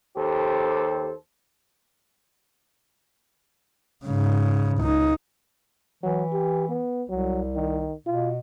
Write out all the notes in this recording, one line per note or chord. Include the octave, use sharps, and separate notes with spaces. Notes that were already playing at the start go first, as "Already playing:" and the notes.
D#2 G4 A4 C5
G#2 C#3
C#2 D#4
E3 F#3
G4
B3
C2 F#3
D#3
B2 F4